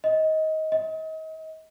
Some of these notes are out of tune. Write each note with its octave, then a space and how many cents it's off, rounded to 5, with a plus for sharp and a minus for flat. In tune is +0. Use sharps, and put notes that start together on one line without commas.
D#5 +20
D#5 +35